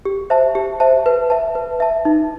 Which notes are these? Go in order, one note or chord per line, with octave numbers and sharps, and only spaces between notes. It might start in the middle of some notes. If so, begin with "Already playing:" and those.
G4
C5 E5 A5
G4
C5 E5 A5
B4
E5 A5
B4
E5 A5
D#4